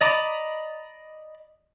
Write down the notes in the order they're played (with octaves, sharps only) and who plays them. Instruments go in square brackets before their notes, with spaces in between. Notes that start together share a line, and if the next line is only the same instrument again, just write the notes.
[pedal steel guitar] D5 D#5 A#5 B5 D6